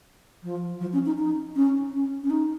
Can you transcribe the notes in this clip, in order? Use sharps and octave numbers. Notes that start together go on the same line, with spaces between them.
F3
F3
C#4
D#4
D#4
C#4
C#4
C#4
D#4